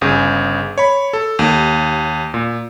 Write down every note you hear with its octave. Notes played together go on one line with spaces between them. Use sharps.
G1 C#3 G#4
C#5 B5
A4
D#2
A#2